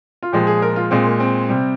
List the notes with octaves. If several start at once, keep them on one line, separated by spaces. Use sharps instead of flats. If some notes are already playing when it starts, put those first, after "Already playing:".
F4
A#2 F3 G#3 G4
G#4
A#4
F4
A#2 G#3 C4
A#3
C4
C3 G3